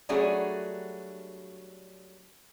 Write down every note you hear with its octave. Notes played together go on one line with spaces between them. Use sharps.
F#3 G3 A3 D4 F#4 G#4